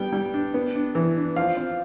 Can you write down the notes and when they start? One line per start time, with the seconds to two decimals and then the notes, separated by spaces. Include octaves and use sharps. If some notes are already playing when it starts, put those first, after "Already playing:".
Already playing: G3 B3 G5
0.13 G3
0.34 D4
0.54 B3
0.76 D4
0.95 E3
1.17 D4
1.36 F3 F5
1.57 C4